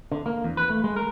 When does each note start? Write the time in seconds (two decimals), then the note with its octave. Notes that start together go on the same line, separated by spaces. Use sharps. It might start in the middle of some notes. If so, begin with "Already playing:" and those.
0.12 D3
0.26 A#3
0.44 E2
0.57 B4
0.70 A3
0.84 G#3
0.96 A#4